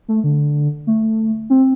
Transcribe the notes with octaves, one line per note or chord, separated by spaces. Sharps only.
A3
D3
A3
C4